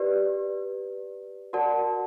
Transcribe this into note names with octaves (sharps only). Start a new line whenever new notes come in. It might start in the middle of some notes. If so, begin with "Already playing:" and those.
Already playing: G4 B4 D5
F#4 A#4 D5 F#5 A5